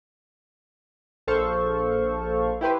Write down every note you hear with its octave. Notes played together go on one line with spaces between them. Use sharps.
A#1 A4 C5 F5 C#6
E4 G4 B4 C5